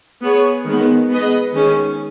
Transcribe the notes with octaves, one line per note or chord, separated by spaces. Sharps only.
B3 G#4 C#5
D#3 G#3 B3
B3 G#4 B4 D#5
D#3 G#3 C#4 G#4